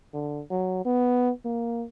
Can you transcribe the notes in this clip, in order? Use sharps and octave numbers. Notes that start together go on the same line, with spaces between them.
D3
F#3
B3
A#3